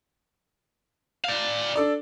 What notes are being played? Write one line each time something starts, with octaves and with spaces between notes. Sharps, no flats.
D5 F5
D4 A4 D5